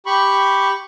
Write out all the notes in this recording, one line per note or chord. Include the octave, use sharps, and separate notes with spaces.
G4 B5 C#6